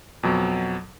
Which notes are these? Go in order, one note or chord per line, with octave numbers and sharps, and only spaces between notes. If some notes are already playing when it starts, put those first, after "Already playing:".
F2 B2 F#3